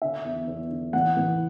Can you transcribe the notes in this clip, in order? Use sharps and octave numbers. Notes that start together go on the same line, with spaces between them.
D3 E5
E2
E2
D3
E3 F#5
E3